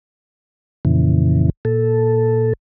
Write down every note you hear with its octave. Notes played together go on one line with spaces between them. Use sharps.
F2 A#2 C#3 E3
A#2 A4